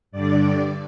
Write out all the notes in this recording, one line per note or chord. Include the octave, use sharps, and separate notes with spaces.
G2 D3 D5